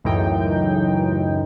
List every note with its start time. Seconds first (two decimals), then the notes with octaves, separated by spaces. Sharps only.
0.04 C#2 F#2 A2 E3 D#4 G5